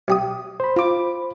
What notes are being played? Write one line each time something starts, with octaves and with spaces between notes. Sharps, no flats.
B1 G4 D#6
C5 B5
F4 D6